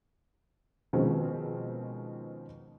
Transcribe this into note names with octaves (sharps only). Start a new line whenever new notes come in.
B2 D#3 F3 G#3 C4 C#4